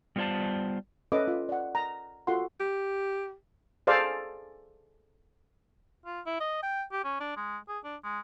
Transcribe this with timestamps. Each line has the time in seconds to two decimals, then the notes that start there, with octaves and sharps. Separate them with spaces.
0.16 G3 B3 F4 C5 D5 A5
1.12 C#4 A4 B4 D#5 E5 D6
1.28 F4
1.49 D5 F#5
1.75 A#5
2.27 F4 F#4 A4 F#5 C6
2.60 G4
3.87 G#4 A4 C5 D5 F5
6.06 F4
6.26 E4
6.40 D#5
6.63 G5
6.92 G4
7.04 C#4
7.20 D4
7.37 G#3
7.68 G#4
7.84 D4
8.04 G#3